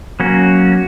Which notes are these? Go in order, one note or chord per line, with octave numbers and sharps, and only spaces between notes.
F#3 A#3 C#4 F#4